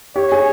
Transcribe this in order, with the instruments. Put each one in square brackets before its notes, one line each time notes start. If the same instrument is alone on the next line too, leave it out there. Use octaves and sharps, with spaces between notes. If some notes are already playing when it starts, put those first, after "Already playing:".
[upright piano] G4 [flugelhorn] C#5
[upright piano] G#4